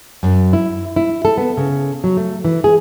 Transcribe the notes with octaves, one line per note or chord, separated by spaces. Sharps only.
F#2
E4
E4
A4
B3
C#3
F#3
A3
E3
G#4